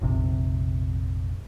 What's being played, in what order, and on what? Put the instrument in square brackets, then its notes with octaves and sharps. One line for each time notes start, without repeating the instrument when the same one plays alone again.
[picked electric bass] F1 A#1 C3